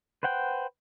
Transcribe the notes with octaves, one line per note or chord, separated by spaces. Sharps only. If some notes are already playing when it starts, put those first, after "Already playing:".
B4 C5 F#5 G5